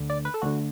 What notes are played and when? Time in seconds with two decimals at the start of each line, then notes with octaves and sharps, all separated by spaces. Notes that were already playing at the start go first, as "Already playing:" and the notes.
Already playing: D2 D3
0.10 D5
0.25 B4
0.34 A4
0.42 D2 D3 F#4